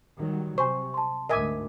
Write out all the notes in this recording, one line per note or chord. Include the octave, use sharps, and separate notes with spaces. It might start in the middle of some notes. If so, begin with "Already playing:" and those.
D#3 F#3 G3
C3 C5 G#5 C#6
A5 C6
D2 G#2 A#4 D#5 E5 G#5 D6